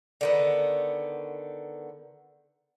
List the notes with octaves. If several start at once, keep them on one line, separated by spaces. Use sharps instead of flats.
D3 D#3 B3